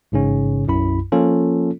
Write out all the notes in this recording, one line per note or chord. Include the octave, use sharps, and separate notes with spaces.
A1 G#2 C#3 C#4
B1 F#2 E4 B5
F3 A#3 C#4 F4 A4